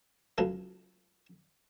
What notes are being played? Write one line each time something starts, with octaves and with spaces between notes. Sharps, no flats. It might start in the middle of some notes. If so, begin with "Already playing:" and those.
C#2 F#3 A4